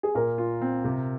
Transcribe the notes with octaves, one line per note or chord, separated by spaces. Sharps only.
G#4
A#2 A#4
F4
C4
C3